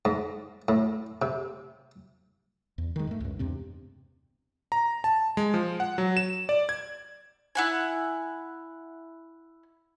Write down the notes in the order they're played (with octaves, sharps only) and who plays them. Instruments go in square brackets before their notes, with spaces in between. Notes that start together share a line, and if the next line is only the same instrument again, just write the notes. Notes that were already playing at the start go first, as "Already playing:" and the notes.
[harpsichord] G#2
A2
C3
[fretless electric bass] E2
D#3 G#3
G#2 A3
C#2 F#2
E2 G2 C3 C4
[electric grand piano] A#5
A5
G#3
F3
F#5
F#3
E7
D5
G#6
[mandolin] E4 F#5 G#5